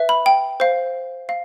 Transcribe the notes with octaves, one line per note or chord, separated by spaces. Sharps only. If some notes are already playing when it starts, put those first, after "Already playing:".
Already playing: B4 E5
B5
G5
C5 F5
F5